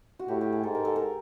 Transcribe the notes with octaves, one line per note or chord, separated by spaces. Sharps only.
F#4
A2 G4
G4
G#4
G#2 A4
A#4
A4
A#4